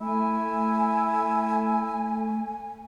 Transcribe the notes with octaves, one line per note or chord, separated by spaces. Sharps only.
A3 E4 G#5